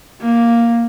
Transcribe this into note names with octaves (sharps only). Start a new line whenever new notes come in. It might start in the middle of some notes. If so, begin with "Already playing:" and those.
A#3